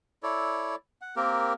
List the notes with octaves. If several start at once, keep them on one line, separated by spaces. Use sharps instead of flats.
E4 A4 C#5 D5
F#5
A#3 C4 G4 A#4